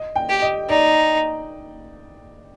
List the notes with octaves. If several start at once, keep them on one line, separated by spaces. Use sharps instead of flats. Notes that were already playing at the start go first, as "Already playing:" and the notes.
Already playing: D#5
G5
G4
D#5
D#4 D5